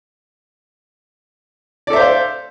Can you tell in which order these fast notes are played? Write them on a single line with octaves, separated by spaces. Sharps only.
D5 A4 E5 C5 F5